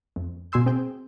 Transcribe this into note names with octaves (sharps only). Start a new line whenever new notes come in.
F2
B2 G#5 C6 E6 G6
C4 G#4 G5